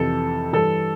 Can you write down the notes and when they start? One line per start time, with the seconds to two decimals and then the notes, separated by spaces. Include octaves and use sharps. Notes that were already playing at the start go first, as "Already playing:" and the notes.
Already playing: F2 C3 E3 A4
0.53 G2 E3 A4